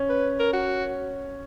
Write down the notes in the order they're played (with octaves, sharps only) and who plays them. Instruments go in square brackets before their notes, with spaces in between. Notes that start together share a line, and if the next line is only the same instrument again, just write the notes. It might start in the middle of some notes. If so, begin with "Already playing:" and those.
Already playing: [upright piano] C#4
[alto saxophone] B4
A#4
F#4